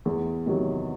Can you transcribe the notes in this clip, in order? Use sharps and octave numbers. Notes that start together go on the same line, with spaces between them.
E2
C3 D#3 F#3